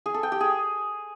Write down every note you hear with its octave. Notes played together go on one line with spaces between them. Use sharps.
G#4
A4
G5
G4
G#4